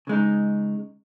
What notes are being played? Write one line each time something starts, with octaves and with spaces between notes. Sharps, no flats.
C#3 G#3 D#4